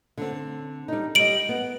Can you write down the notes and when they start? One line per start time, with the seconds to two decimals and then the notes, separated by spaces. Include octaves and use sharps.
0.18 D3 C4
0.88 G3 D#4
1.15 G3 G4 D#5 D7 F#7
1.49 B3